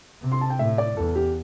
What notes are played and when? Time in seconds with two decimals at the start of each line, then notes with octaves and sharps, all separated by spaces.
0.22 C3
0.32 C6
0.41 A5
0.50 G5
0.59 A2 E5
0.78 D5
0.97 E2 A4
1.15 G4